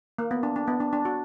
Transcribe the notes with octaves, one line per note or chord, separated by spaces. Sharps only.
A#3
B3
D4
D4
B3
D4
D4
F#4